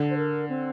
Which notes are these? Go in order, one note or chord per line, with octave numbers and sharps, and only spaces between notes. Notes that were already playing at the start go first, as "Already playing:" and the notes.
Already playing: D3
C5
A#4
C4